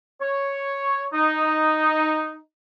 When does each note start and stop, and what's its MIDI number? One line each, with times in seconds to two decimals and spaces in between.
0.22 1.06 73
1.14 2.40 63